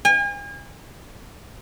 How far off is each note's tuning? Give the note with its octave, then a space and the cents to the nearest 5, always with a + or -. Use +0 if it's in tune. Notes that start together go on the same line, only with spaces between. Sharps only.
G#5 -40